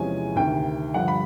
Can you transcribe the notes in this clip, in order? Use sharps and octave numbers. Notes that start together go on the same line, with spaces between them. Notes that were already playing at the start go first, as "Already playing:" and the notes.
Already playing: E2 C3 F3 G#3 C#4 G#5
D2 C3 D#3 G5
G2 D3 F3 F#5
B5